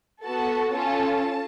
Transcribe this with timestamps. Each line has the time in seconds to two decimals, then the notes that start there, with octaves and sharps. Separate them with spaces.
0.23 B3 F#4 A4 A5
0.72 C#4 F4 A4 A5